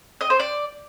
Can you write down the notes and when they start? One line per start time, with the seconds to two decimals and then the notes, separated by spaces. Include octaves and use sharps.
0.21 D#5
0.30 C5
0.40 D5